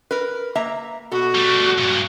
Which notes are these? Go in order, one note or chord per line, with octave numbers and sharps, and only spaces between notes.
A#4 B4
A#3 E5 A#5
B2 F#4 A4
G3 A3
G2 A#2